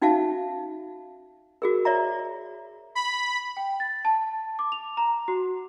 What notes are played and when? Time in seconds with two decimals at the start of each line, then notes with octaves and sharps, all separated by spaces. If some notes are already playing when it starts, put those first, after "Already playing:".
0.02 C#4 D#4 F#4 E5 F5 A5
1.62 F#4 G#4 A#4
1.85 C#5 D5 E5 A#5
2.95 B5
3.57 G5
3.80 A6
4.05 A5
4.59 D6
4.72 F7
4.97 A#5
5.28 F#4